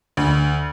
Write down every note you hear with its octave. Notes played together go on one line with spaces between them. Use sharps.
D2